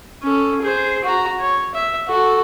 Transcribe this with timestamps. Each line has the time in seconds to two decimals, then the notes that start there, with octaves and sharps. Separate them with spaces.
0.23 C#4 A4
0.62 G#4 C5
1.04 F#4 A#5
1.40 C#5
1.75 E5
2.08 F#4 A4